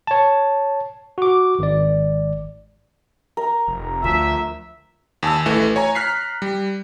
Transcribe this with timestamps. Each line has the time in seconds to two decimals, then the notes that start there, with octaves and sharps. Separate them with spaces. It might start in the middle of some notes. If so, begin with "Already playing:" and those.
0.07 C#5 A5
1.18 F#4 D6
1.59 G#1 D5
3.37 A#4 A#5
3.68 F1
4.04 D2 F3 E5
5.23 D#2 G#5 A5 E6
5.46 A1 E3 A3
5.76 C#5 G#5 A#5
5.95 A#5 F6 F#6 B6 C7
6.42 G3